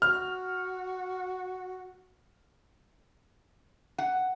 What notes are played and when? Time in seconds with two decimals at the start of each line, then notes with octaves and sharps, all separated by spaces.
0.02 F#4 F6
3.98 F#5